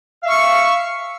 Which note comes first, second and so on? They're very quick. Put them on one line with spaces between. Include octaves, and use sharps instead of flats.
F5 E5 C#6